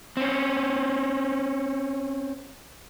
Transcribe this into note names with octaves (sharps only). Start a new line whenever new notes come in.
C4 C#4